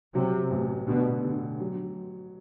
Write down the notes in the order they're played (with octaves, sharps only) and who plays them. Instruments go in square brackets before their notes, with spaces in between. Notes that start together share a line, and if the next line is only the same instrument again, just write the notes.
[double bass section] C3 [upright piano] F#3
[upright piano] A1
[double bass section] B2 [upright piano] D3
[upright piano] D3
F#3